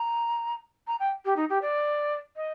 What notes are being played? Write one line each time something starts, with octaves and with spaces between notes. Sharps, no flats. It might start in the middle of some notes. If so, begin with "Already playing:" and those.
Already playing: A#5
A#5
G5
G4
D#4
G4
D5
D#5